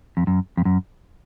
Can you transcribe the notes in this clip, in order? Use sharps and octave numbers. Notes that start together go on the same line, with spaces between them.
F2
F#2
F2
F#2